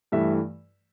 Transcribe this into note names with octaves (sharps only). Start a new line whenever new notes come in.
G2 E3 A3 E5